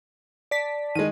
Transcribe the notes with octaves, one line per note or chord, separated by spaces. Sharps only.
D5 A5 B6
D#3 G#3 D#7